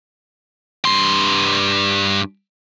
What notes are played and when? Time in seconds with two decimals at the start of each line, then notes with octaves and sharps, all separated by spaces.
0.85 G2 C6